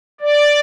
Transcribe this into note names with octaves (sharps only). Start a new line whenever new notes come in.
D5